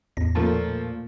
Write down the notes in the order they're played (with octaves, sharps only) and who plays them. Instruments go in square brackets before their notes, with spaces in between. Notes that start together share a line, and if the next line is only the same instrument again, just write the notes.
[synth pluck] E2 A2 A#6
[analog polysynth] A#2 [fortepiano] F3 A3 A#3